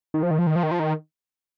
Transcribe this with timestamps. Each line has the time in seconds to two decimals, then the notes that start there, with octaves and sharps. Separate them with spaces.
0.14 D#3
0.23 F3
0.31 D#3
0.39 F3
0.47 D#3
0.56 F3
0.63 D#3
0.71 F3
0.80 D#3